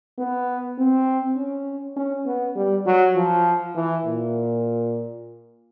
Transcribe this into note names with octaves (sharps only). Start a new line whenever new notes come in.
B3
C4
C#4
C#4
B3
G3
F#3
F3
E3
A#2